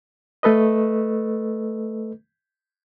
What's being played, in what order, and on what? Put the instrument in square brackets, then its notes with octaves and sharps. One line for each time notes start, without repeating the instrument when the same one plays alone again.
[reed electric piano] A3 A4 B4 D#5